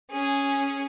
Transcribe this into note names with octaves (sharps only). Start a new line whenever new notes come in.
C#4 G#4